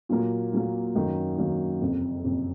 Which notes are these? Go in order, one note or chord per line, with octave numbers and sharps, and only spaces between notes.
A#2 F#3 A#3
A#2 F#3 A#3
F#2 D#3 F#3 A#3
F#2 D#3 F#3 A#3
F#1 F2 C3
F#1 F2 C3